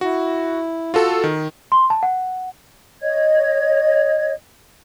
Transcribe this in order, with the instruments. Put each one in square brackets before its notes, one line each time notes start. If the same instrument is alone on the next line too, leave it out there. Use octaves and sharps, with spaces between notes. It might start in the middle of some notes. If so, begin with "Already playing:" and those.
[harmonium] E4 [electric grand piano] F#4
[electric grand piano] F4 F#4 A4
D#3
[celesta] C6
A5
F#5
[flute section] C#5 D#5 G#6